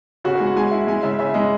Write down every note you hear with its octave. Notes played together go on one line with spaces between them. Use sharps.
C#3 F#4
G#3 G#4
F#5
G#3 G#5
E4
G#3 G#5
C#3 E5
C#3 E5
G#3 D#5